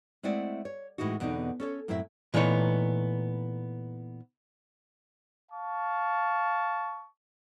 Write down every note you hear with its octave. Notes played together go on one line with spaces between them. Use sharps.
G#3 A3 C4 E4 D5 F#5
C#5
A2 E3 G#3 D#4 F#4
E2 B2 D3 C4 D#4
C#4 A4 C#5
F#2 A2 C4 E4 F#4 E5
A#2 E3 A3 B3 D#4 C#5
F5 A5 C#6